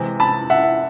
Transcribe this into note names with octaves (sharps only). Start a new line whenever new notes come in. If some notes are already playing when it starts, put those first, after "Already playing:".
Already playing: C3 E3 G#3
A5 B5
E5 F#5